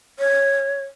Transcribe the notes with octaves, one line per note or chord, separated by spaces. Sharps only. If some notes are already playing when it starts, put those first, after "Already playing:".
C#5